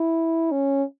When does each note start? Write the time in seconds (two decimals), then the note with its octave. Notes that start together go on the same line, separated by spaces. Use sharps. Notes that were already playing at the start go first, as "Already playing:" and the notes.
Already playing: E4
0.51 C#4